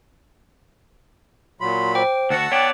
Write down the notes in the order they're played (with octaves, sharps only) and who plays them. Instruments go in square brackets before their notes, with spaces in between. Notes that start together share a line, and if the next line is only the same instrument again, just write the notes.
[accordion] A#2 F#3 B5 [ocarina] C6
[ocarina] C5 [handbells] G5 D6
[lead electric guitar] D2 F#4 [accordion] F#5 A5 E6
[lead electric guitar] B3 D5 [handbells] C#5 D6 [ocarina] G5